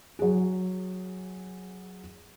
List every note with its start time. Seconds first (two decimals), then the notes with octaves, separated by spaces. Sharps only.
0.19 F#3 G#4